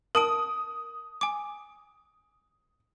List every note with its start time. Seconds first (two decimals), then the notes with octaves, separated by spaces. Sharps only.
0.15 A#4 A5 D#6 D7
1.21 G#5 D6